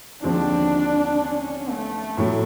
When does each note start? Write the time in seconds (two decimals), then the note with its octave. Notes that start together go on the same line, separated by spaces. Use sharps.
0.23 D#2 D3 F3 G#3 C4 D4
1.20 C#4
1.70 A3
2.17 A2 F#3 A3